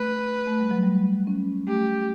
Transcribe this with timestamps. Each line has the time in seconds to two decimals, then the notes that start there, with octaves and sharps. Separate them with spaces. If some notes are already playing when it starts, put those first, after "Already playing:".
Already playing: A3 B4
0.47 A3
0.60 G3
0.71 F#3
0.83 G3
1.27 C#4
1.67 A3 G4